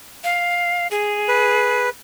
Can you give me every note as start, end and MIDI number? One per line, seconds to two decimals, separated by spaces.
0.24 0.87 77
0.91 1.87 68
1.28 1.90 71